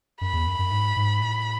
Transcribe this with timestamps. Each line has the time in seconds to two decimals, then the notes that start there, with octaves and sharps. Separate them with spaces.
0.21 F#2 B5
0.33 E2
0.47 F#2
0.59 F#2
0.71 G#2
0.96 G#2
1.21 A2